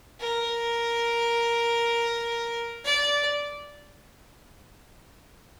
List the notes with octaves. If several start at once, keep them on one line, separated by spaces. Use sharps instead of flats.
A#4
D5